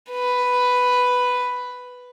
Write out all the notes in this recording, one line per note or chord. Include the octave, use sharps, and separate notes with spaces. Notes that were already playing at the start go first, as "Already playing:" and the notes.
B4